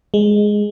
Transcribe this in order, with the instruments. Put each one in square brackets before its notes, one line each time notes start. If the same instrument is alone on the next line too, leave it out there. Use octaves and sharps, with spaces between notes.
[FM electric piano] G#3